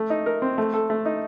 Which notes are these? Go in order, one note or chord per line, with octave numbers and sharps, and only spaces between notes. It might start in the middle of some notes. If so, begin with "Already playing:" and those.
Already playing: A3
D#4
A#4
C4
A3
A4
A3
D#4